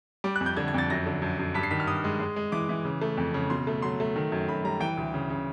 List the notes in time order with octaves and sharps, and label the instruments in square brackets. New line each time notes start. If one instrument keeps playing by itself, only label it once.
[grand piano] G3 D6
F#6
F2
G6
D3 G#6
G#6
F2 A6
F#2 A#6
D3
F#2
F#2
G2 B6
C7
D#3 B6
F6
G2 D#6
G#3
G#3
G#3
E3 D6
E3
C#3
A3
F2
C#3
B2 C6
A3
F#3 C6
A3
D#3
F#2
F#2 B5
G3 A#5
E3 G5
D2
C#3
C#3